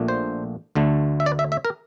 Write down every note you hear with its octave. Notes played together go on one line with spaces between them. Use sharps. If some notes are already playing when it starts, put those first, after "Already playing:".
Already playing: A#1 A#2 A3 D4
C5
D2 D3 A3
E5
D5
E5
E5
A#4